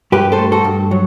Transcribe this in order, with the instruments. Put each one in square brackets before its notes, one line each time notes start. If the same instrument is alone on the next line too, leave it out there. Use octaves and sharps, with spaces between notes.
[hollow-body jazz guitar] G2 G4 B4
A4 C5
A3
F#4 A4
G2
F#3